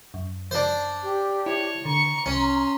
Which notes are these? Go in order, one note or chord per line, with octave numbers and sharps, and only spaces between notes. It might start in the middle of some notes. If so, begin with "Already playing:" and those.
F#2
D4 C5
G4
E4 C#5
D3 A#5 C#6 C#7
C2 C#4 C6